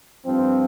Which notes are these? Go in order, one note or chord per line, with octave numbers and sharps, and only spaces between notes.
G2 F3 C4